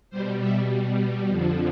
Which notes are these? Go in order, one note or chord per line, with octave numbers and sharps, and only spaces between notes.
B2 G3 C5
E5
F2 D3 F3